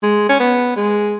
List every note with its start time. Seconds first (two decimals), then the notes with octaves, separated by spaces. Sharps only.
0.03 G#3
0.29 C#4
0.40 B3
0.76 G#3